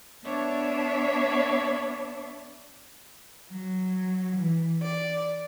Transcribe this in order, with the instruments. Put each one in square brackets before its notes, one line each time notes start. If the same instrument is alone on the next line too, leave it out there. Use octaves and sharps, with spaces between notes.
[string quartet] B3 D4 C#5 D5 E5
F#3
E3
D5